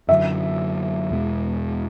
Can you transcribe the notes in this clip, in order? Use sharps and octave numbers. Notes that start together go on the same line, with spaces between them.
F#2 D3 F#3 E5
E2 B2 G#3